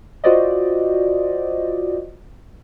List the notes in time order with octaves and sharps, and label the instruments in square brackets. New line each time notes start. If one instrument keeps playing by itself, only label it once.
[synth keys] F4 F#4 C5 D5 D#5